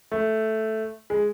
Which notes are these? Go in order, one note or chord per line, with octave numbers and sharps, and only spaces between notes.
A3
G#3